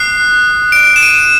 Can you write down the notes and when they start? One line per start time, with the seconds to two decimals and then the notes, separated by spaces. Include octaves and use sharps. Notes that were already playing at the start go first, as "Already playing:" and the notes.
Already playing: D#6 F#6 C7
0.72 D7
0.96 E7
1.03 D#7